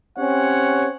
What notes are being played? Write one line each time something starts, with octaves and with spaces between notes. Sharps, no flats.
C4 C#4 G4 C#5 F#5